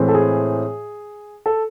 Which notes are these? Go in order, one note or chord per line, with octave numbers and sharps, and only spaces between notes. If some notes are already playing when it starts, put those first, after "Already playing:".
Already playing: A2 E3 G#3 C4
A4
G#4
A4